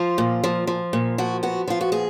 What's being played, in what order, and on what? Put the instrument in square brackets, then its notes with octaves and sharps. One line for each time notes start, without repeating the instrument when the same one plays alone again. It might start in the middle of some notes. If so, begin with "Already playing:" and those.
Already playing: [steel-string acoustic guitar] F3 F4
A#2
F3
F3
A#2
F3 F#4
B3 F#4
F3 F4
F#4
A#2 G#4